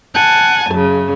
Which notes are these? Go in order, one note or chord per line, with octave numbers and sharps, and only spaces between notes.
F#5 G#5 A5
F#2 C#3